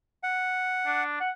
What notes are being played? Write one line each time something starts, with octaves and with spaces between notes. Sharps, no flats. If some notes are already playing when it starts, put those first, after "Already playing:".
F#5
D4
F#5